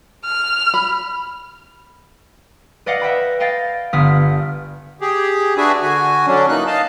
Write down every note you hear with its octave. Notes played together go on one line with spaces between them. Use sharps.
F6
B5
B4 D5 D#5 F5 F#5
D#5 E5 G5 B5
D#5 F5 G5 A6
G1 B3 D#6 F6 B6
G4 G#4
D4 F#4 G#4 B4 E5 G#5
D3 F#4 G#5
D3 F#3 C#4 D4
E3 A#3 D#4 F#6
D#5 F5 A5